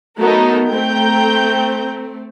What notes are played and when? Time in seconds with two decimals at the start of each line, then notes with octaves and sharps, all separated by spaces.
0.18 F#3 A3 B3 D#4 A4 A#4
0.70 A3 C4 G5 A#5 G6